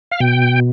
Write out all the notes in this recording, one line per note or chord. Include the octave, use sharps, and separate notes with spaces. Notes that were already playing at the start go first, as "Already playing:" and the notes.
F5
B2 G5